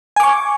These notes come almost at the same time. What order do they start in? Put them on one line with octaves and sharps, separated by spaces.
G#5 D6 C#6